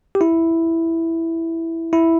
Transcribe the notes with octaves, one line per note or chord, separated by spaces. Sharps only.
G4
E4
E4